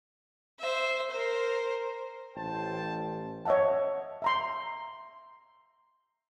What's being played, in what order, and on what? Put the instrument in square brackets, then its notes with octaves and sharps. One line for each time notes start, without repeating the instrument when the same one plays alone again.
[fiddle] C5 E5
A#4 C5
[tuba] A1 [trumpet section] C5 G5 A5
[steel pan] C#5 D#5 E5 F#5 A5
E5 A#5 C6